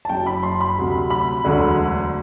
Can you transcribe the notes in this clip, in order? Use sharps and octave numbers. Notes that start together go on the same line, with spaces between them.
A5
F#1 F#2 F#3 G5
B5
C6
B5
D2 C3 F#3
B5
E1 D2 D3 F#3